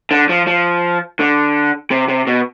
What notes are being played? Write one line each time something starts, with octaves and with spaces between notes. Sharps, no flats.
D3
F3
F3
D3
C3
C3
B2